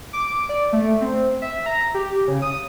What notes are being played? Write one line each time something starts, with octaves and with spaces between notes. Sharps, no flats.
D6
D5
A3
C4
E5
A#5
G4
C#3
D#6